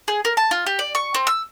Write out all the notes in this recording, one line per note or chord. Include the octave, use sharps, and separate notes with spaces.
G#4
A#4
A5
F4
G4
D5
C#6
C4
E6